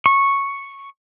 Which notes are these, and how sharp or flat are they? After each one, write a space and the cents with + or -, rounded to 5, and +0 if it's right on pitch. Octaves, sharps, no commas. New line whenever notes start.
C#6 -5